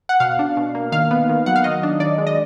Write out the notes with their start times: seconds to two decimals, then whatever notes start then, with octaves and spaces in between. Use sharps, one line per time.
0.09 F#5
0.20 B2 F5
0.39 D4
0.57 B2
0.75 A#3
0.92 D#3 F5
1.11 B3
1.29 D#3
1.46 F#3 F#5
1.56 F5
1.64 D#3 D#5
1.83 D4
2.00 D#3 D5
2.18 G#3
2.27 D#5